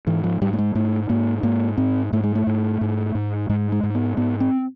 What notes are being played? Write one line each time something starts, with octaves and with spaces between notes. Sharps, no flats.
G#2 E3
F3
G#2 G3
A3
G#3
G#2 A3
G#2 A#3
G#2 A#3
G#2 C4
G#2 A3
G#3
A3
G#2
G#2
G#2
G#2 G#3
G#3
G#2
B3
G#2 B3
C4